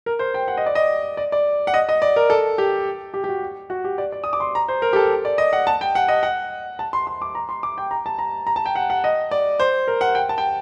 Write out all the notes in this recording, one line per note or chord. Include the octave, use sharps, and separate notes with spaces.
A#4
C5
G5
F#5
D#5
D5
D#5
D5
D5
F#5
D#5
D#5
D5
A#4
A4
G4
G4
G4
F#4
F#4
G4
D5
D5
D#6
D6
C6
A#5
C5
A#4
G4
A4
D5
D#5
F#5
A5
G5
F#5
D#5
F#5
A5
C6
C6
D6
A#5
C6
D6
G5
A#5
A5
A#5
A#5
A5
G5
F#5
F#5
D#5
D5
C5
A#4
F#5
G5
A5
G5